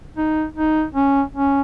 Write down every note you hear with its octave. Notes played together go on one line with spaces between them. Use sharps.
D#4
D#4
C#4
C#4